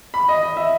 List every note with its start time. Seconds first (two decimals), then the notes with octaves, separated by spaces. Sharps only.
0.14 B5
0.29 D#5
0.43 D#5
0.57 E5